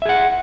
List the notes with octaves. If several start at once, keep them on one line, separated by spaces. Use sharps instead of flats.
G#4 E5 F#5